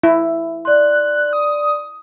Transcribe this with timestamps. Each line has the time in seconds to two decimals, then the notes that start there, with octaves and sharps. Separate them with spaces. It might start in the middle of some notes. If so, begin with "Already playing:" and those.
0.04 E4
0.65 D5 C6 F#6
1.33 D#6